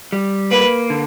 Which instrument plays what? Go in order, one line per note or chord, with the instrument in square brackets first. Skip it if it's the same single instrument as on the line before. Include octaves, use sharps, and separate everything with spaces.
[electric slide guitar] G3
[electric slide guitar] A#3 [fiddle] B4
[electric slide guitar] D3